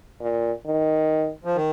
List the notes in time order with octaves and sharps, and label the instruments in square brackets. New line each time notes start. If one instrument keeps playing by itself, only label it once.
[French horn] A#2
D#3
[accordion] F3
D#3